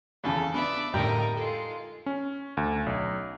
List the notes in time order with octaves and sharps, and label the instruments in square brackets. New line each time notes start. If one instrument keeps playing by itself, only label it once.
[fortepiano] A#1 E2 C#3 [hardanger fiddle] A4
[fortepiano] B3 [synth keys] D4 [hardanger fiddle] D5 E5
[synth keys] F2 A2 D3 [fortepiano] G3 G5 A#5 [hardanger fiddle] D#4 A#4
[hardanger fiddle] G#3 F4 [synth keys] A4
[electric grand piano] C#4
D2
B1